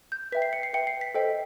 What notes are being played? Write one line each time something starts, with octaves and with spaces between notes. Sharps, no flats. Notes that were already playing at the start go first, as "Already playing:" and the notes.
G6
B4 E5 G5 B6
C7
C#7
C7
B4 E5 G5 C#7
C7
B6
A4 C5 D#5 G5